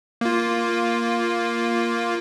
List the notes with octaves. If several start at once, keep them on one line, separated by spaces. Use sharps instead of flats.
A#3 F4